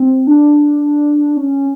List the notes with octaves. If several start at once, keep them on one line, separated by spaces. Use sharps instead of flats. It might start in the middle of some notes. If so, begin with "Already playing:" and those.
Already playing: C4
D4
C#4